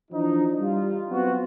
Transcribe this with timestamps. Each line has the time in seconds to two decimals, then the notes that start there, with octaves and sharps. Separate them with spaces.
0.11 E3 F3 D4 D#4
0.60 G3 F4
1.10 F#3 B3 C4 F4 F#4